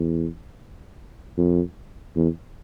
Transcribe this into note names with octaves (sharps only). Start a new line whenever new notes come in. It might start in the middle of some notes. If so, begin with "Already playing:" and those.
Already playing: E2
F2
E2